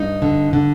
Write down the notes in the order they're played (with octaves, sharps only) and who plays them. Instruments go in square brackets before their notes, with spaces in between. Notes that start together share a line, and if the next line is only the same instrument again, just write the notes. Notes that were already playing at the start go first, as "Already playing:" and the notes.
Already playing: [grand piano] G2 [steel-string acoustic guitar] D#4
[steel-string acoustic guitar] D3
D3